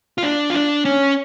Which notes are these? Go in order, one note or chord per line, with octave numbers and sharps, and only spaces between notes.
F4
D4
F4
D4
C#4